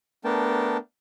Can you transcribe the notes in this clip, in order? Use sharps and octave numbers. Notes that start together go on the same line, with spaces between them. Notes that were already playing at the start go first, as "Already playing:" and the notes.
A3 B3 D4 A#4 G5 A5